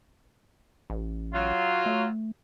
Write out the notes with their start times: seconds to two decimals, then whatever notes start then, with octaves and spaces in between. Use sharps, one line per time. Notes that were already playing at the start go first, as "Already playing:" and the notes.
0.90 A1
1.34 F#3 F4
1.86 A3